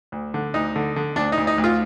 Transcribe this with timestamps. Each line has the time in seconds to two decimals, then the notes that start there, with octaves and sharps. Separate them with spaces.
0.12 D2
0.34 D3
0.54 D2 D#4
0.76 D3
0.96 D3
1.16 D2 D4
1.32 D#4
1.37 D2
1.47 D#4
1.58 D2
1.64 F4